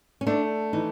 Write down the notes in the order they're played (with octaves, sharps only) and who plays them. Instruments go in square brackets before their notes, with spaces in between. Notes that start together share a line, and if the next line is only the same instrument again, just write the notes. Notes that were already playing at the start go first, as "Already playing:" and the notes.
[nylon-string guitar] C#4
[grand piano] A3 [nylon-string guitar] D4
[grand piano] E3 [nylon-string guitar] D#4